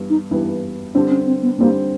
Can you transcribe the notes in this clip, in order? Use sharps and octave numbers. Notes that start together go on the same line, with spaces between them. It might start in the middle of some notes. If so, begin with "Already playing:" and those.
Already playing: G2 E3 G3 B3
D#4
G2 E3 G3 B3
D3 G3 C4 D4
C#4
C4
B3
D3 G3 A#3 C4